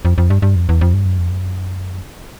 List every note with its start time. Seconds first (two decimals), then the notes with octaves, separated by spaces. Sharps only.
0.05 F2
0.18 F2
0.30 G2
0.42 G2
0.56 F2
0.69 E2
0.81 F2
0.94 G2
1.06 F#2
1.18 F2
1.30 F#2